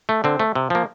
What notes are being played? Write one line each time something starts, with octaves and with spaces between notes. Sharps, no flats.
A3
D3 C4
A3
C3
F3 A#3